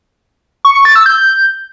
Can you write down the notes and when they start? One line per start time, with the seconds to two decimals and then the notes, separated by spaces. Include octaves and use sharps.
0.65 C#6
0.75 C#6
0.85 A6
0.95 E6
1.06 G6